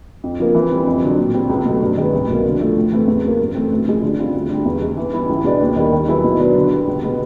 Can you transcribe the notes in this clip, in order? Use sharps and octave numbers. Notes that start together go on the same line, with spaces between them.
F2
C#3 F3 A#3
E3
G3 C4
F2
D3 F#3
A#2
G3 C4
C#2
B2 F#3 A3
G2
D#3 G#3 B3
C2
B2 F#3 A#3
D3
F3 A3
A2
E3 A3 C4
E2
C#3 F#3 A#3
G2
E3 A3 C4
D2
C#3 F3 G#3
D3
G3 C4 F4
D2
D3 G3
E2
C#3 E3 G#3
E3
G3 B3 E4
C#2
B2 G#3 B3 D4
D#2
D#3 G3 A#3 D#4
D#3
F#3 B3 E4 G#4
B2
F#3 B3 D4
D3
G3 B3
C#2
B2 G#3 B3